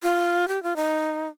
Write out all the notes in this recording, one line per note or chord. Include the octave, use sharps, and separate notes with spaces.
F4
G4
F4
D#4